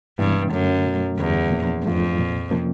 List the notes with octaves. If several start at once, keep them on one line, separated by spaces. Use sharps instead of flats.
G2 C3 E3 G#3 B3 E4
F#2 D3 F#3 A3
B2 F#3 A3
E2 G2 D3 G3
A#2 F3 A#3 C#4
F2 G#2 F3 A3 D4 F4
C2 A#2 F3
C3 F3 A#3 C#4